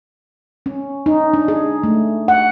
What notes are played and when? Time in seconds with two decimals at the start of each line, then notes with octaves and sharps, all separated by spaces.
0.66 C#4
1.06 D#4
1.33 D4
1.48 G#4
1.84 A3
2.28 F#5